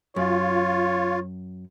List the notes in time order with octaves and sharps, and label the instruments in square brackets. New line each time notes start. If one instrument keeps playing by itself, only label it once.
[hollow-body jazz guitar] F#2 [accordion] F4 [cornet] C#5